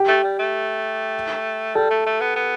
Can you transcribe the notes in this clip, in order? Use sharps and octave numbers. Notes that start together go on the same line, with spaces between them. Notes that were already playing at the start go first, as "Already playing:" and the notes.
Already playing: G4
A3
G3
A3
G3 A4
A3
A3
B3
B3